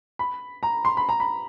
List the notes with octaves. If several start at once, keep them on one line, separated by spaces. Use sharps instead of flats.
B5
A#5
C6
B5
A#5
B5